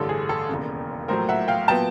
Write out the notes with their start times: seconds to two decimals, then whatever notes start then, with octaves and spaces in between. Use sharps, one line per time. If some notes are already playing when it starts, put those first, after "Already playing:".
Already playing: A1 G2 D3 G3 A4
0.09 G#4
0.29 A4
0.49 E1 D#2 C#3
1.08 A#1 A2 F#3 A#4 C5
1.29 E5 F#5
1.48 F5 G5
1.68 A#2 F#3 B3 G5 A5